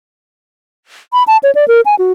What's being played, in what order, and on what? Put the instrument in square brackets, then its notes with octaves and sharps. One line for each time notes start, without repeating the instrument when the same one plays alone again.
[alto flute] B5
A5
C#5
D5
A#4
G#5
F#4